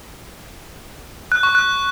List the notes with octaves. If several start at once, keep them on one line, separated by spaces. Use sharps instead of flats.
F#6
C#6
F#6